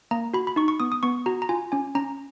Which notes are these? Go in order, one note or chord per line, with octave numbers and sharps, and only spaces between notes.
A#3 A#5
F#4 B5
B5
D#4 C#6
C#6
B3 D#6
D#6
B3 C#6
F#4 A#5
A#5
F4 G#5
C#4 G#5
C#4 A#5